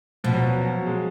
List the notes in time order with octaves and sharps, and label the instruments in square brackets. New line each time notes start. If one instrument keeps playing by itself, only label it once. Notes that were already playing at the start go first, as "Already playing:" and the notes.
[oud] B2 [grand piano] F3
[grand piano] F#3
F3
F#3
G#3